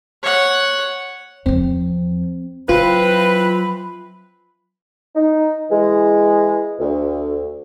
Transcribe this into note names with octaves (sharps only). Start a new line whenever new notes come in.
C#5 F#5
E2 F3 C4
E3 F#3 C4 F4 B4 B5
D#4
E3 G#3
D2